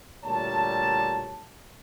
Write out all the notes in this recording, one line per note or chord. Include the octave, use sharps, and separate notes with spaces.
D2 A#2 G3 C#5 A5